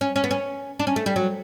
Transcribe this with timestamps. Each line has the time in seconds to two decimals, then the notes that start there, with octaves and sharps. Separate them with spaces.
0.01 C#4
0.16 C#4
0.24 B3
0.31 C#4
0.79 D4
0.87 C#4
0.96 A3
1.06 G3
1.16 F#3